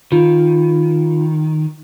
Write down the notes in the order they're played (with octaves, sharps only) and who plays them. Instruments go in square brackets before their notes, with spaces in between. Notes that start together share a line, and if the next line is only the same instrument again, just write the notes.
[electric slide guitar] D#3 [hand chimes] F4